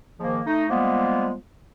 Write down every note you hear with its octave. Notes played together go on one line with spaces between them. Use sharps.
G#2 D#3 F3 A#3
A3 D#4
F3 G3 G#3 A#3 B3